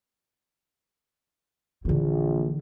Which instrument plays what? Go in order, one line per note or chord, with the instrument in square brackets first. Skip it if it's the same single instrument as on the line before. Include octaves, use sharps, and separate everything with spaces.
[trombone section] A#1 [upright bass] D3 E3